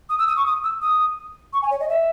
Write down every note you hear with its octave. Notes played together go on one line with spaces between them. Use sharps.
D#6
E6
D#6
C#6
D#6
E6
D#6
C#6
G#5
C#5
D#5
E5